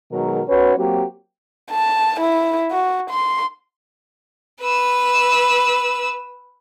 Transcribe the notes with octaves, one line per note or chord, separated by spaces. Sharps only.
B2 D#3 F#3 G#3 A#4
C#4 F#4 B4 C#5
F#3 A#3 C4 F#4 G4
A5
E4
F#4
C6
B4 E6